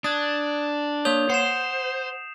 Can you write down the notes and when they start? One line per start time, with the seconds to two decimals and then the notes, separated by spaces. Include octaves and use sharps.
0.04 D4 D#6 F#6 G#6 A6
1.05 A#3 C#5 D#6 G6 F7
1.30 C5 F#5 C7 E7